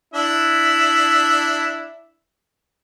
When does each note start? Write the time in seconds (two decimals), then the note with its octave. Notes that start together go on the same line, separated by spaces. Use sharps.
0.14 D4 E4 E5